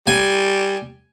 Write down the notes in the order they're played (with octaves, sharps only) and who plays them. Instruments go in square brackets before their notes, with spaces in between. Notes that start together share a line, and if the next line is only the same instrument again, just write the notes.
[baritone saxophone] G3 [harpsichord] G#5